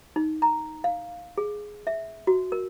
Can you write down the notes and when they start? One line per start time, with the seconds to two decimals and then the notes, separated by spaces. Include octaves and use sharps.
0.16 D#4
0.42 A#5
0.84 F5
1.38 G#4
1.87 E5
2.27 F#4
2.52 A#4